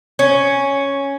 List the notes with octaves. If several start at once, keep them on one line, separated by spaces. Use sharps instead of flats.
C#4